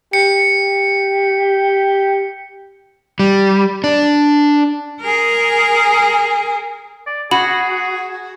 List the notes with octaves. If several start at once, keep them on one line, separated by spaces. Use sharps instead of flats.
G4 C#7
G3
D4
G#4 A#4
D5
F#4 G#4 B5